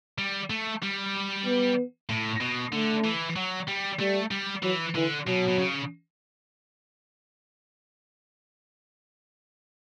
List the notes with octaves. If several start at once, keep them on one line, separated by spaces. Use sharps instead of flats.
G3
A3
G3
B3
A2
B2
D3 A3
E3
F#3
G3
G3 A3
G3
E3 F#3
D3 E3
B2 F#3
B2
C#3